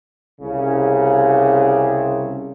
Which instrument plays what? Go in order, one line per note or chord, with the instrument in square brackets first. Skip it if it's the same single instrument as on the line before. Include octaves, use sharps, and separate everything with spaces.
[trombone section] C2 C#3